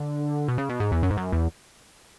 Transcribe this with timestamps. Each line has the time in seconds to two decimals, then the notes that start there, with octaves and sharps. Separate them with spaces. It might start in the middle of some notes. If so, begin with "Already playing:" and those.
Already playing: D3
0.48 B2
0.58 C#3
0.69 B2
0.80 G#2
0.92 E2
1.03 F#2
1.11 G#2
1.17 F#2
1.32 E2